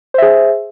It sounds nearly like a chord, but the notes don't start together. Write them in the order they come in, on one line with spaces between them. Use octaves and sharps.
C5 E5 G#4